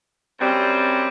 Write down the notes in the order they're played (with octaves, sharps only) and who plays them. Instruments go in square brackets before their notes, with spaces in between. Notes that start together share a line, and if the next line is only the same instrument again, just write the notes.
[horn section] F#2 G3 C4